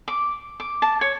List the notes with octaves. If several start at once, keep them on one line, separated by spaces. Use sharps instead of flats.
D6
D6
A5
C#5